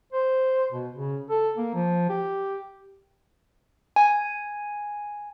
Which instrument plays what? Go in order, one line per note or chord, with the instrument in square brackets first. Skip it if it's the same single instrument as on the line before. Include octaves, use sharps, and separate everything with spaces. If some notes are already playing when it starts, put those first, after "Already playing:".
[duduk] C5
B2
C#3
A4
A#3
F3
G4
[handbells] G#5